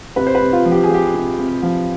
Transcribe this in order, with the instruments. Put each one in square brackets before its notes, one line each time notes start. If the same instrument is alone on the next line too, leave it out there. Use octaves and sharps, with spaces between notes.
[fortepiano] C3 B4
C5
B4
C3
F4
F3
G4
G#4
F3 G4
C3
C3
F3